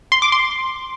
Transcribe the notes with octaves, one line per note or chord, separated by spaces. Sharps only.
C6
D6
C6